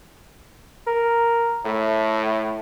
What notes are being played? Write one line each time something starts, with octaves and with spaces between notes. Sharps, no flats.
A#4
A2 A3